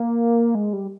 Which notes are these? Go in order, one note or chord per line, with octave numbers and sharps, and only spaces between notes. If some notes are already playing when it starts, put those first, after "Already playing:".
Already playing: A#3
G#3
G3